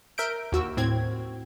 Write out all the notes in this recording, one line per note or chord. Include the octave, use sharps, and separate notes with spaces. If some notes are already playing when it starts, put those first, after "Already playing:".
A#4 E5 G6 D7
D#2 F#4 E6
A2 C4 G#6